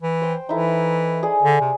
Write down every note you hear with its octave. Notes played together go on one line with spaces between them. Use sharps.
E3
C5 G5
E3 D#4 E4 A4
G#4 D5 D#5
D3
C3